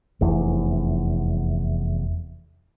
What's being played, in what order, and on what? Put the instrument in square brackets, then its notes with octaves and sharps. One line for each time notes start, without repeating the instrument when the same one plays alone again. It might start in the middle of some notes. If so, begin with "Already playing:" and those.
[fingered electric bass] F1 E2